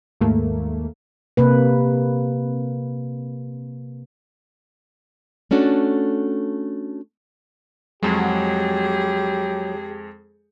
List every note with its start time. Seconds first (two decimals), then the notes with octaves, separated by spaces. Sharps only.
0.21 D#2 G#2 A3 A#3
1.37 C3 A#3 B4
5.51 A3 C#4 D4 F#4 A4
8.03 F2 F#3 G#3 G4 G#4